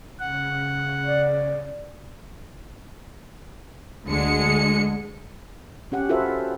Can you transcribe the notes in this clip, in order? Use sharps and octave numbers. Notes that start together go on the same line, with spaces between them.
C#3 F#5
D5
D2 D3 G#3 C#7
C#4 G4 F#5
F4 F#4 A4 B4 C5 E5